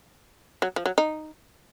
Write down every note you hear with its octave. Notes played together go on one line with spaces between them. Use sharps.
F#3
F3
F#3
D#4